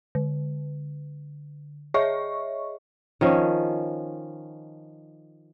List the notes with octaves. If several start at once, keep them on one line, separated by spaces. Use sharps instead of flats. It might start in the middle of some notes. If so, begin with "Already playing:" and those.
D3
G#4 C#5 D#5 E5 C#6
D#3 F3 C#4